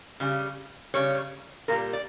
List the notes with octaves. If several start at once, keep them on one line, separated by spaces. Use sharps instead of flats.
C#3 G3
C#3 G3 C#5
A#2 G3 A#4
D5